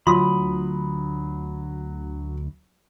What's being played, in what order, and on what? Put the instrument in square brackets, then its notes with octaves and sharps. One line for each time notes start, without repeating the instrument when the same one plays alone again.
[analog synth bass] D2 [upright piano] F#3 [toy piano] F4 C6 [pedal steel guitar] B5 D#6